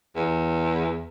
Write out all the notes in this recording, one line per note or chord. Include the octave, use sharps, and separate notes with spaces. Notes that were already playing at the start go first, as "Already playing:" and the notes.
E2